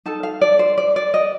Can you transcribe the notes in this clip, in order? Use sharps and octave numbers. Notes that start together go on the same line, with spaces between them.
D#4 A4 A5
F5
D5
C5
D5
D5
D#5